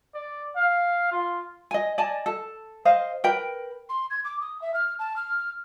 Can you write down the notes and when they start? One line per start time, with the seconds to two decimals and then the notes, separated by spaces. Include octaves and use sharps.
0.15 D5
0.56 F5
1.12 F4
1.71 D#5 G#5
1.98 D5 D#5 G#5 A5
2.26 A4
2.85 C5 D#5 F5
3.24 A#4 B4 G5
3.89 C6
4.10 G#6
4.24 D6
4.41 D#6
4.62 E5
4.74 F6
4.99 A5
5.16 F6